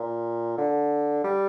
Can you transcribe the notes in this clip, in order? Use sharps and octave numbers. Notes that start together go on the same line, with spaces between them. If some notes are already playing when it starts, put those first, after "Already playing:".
Already playing: A#2
D3
G3